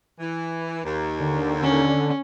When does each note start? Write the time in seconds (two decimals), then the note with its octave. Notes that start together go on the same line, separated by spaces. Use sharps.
0.20 E3
0.84 D#2
1.20 D3
1.62 C#4